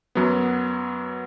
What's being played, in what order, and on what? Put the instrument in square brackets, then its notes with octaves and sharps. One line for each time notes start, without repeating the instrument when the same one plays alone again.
[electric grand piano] F#2 F#3 B3